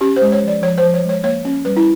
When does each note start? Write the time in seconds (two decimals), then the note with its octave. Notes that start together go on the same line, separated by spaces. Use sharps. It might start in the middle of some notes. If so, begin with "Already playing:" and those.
0.01 C#4 G4
0.16 C5
0.22 G#3
0.32 C#5
0.42 F3
0.48 D5
0.62 F3 C#5
0.78 C5
0.83 F3
0.94 C#5
1.04 G#3
1.09 C#5
1.24 A#3 C#5
1.45 C#4
1.65 G3 B4
1.77 E4